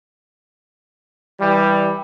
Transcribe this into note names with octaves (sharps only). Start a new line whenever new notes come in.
E3 G3